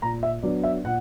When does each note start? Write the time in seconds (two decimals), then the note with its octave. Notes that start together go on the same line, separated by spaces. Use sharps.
0.02 A#2 A#5
0.23 E5
0.43 F#3 B3 D4 D5
0.63 E5
0.85 A#2 F#5